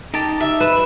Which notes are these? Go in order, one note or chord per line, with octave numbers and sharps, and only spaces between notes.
D#4 G4 A5
E5
B4 E7